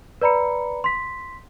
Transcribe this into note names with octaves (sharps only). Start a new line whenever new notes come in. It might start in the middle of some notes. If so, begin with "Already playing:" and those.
B4 D5 A#5 B5 C#7
C6 B6